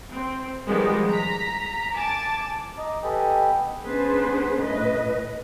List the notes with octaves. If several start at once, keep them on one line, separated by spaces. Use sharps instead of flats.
C4
D#3 F3 G3 G#3 B3
A#5 B6
G#5 A5 D6 A6
D#5 A#5 D6
G4 A4 B4 D#5 G5 G#5
B3
B3 C#4 D4 G#4 B4 C5
A2 B4 D#5